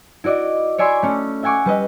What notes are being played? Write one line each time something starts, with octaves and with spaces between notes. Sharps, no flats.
E4 F#4 D5 D#5
C#5 D5 E5 G#5 B5 C6
A3 C#4
E5 F#5 G#5 C#6 D6
G3 B4 D#5